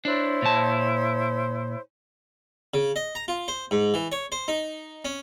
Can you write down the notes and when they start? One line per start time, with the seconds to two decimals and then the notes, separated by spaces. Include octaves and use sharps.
0.05 D4 E4 C5 C#5
0.42 A#2 A5
2.74 C#3
2.96 D#5
3.15 A#5
3.28 F4
3.48 C5
3.71 G#2
3.94 E3
4.12 C#5
4.32 C5
4.48 D#4
5.05 C#4